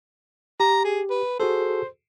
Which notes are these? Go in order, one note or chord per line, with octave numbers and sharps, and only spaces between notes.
G4 A#5
G#4
B4
F#4 G#4 A4 C5